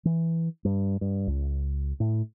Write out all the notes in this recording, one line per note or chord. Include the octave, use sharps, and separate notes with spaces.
E3
G2
G2
C#2
A2